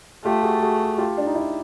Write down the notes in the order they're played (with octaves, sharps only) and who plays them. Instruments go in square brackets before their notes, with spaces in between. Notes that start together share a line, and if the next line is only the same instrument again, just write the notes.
[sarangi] A3 [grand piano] F4 G4
[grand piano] F#4 G#4
F#4 G#4
F4 G4
D4
D#4
D4 E4